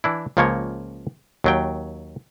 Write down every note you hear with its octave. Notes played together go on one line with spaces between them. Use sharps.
E3 D4 E4
C#2 C#3 F3 A#3 C#5
D#2 F#3 G5